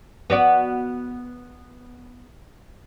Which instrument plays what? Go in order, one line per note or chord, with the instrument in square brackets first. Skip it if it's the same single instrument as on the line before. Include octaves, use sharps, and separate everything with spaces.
[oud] B3 F#4 D5